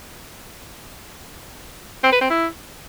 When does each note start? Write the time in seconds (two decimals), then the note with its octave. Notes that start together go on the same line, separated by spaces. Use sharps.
2.03 C4
2.12 B4
2.21 C4
2.30 E4